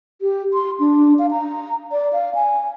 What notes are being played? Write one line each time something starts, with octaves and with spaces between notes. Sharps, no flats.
G4
C6
D4
F5
A#5
D5
F5
G#5